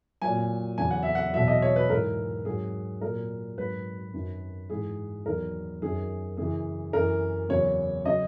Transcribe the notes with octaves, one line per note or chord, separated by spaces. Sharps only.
A#2 F#3 G#5
E2 C#3 F#3 G#5
F#5
E5
F#5
E2 B2 F#3 E5
D#5
C#5
B4
G#2 E3 A#4
G#2 F#3 G#4
A#2 F#3 A#4
G#2 F#3 B4
F#2 D#3 F#3
G#2 E3 G#4
E2 D#3 F#3 A#4
F#2 D#3 F#3 G#4
F#2 C#3 E3 G#4
F#2 E3 A#4
E2 C#3 F#3 C#5
C#3 F#3 D#5